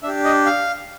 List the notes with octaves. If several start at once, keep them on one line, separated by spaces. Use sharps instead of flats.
D4 G4 E5
D#5
F5